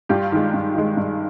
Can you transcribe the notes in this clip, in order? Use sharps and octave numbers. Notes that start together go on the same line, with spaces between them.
G2 F4 G4
D#3 G#3
G2
D#3 G#3
G2